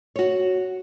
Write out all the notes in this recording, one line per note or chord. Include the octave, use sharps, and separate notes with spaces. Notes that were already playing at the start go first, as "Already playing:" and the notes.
F#4 C#5